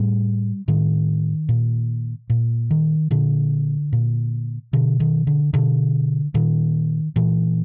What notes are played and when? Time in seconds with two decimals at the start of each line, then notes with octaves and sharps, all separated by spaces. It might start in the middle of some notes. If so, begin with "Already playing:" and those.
Already playing: A2 G3
0.68 A2 D#3
1.49 A#2
2.30 A#2
2.71 D#3
3.11 A#2 D3
3.93 A#2
4.73 B2 D3
5.00 D#3
5.27 D3
5.54 B2 D3
6.34 A#2 D#3
7.16 A#2 E3